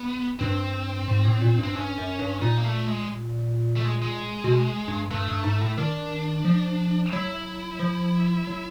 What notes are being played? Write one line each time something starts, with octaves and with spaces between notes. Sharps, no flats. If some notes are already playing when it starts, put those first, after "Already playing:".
Already playing: B3
G2 C4
G#2
A2
A#2
G2
C4
G2 C#4
F#2
G2
A#2 D#4
A#3
A3
G#3
A3
G#3
G#3
B2
G2
G2 A3
G2
G#2
A2
D#3 D4
F3
F#3 E4
F3
F#3